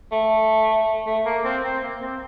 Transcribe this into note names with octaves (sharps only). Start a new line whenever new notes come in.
A3
A3
A#3
C4
C4
A#3
C4